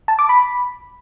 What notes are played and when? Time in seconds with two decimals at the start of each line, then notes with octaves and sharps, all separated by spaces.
0.08 A5
0.19 D6
0.29 B5